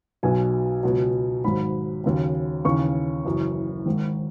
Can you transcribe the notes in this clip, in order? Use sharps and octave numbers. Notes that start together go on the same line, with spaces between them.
B1 B2 F#3 G#5
C#2 B2 F#3
G#1 G#2 F#3 B5
D#2 C#3 F#3
D#2 C#3 E3 C#6
F#1 F#2 E3
G#1 G#2 D#3